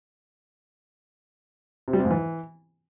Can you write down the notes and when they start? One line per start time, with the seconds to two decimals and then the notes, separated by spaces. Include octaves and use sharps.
1.88 C3
1.93 G3
1.99 C3
2.05 G#2
2.10 E3